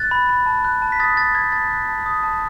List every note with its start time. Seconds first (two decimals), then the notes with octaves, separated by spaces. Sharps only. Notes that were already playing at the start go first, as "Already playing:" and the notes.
Already playing: F#6 A6
0.11 B5
0.29 B5
0.46 A5
0.65 F#6
0.82 A5
0.92 B6
0.99 D#6 A6
1.17 A5 A6
1.35 F#6 G#6
1.52 A5 A6
1.70 F#6
1.89 A5
2.06 D#6
2.24 A5